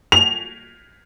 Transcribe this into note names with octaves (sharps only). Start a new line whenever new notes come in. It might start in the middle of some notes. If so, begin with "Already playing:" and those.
F7